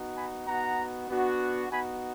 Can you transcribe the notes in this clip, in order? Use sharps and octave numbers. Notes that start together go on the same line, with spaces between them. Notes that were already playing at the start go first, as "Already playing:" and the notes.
Already playing: B3 D#4 F#4
G#5 B5
B3 D#4 F#4 F#5 A#5
B3 D4 F#4
B3 D#4 F#4 G#5 B5